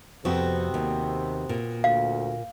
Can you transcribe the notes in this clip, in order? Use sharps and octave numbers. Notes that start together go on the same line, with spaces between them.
F2 C3 B3 C4 F#4
D#2
A#2 A#3
D2 F5